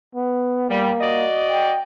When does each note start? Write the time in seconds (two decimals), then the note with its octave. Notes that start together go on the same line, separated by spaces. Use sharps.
0.15 B3
0.69 G3 A#3
1.01 F#4 D5 D#5
1.51 G5